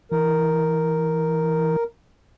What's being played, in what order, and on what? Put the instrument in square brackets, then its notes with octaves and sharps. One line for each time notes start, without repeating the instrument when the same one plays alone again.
[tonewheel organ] E3 [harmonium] A#4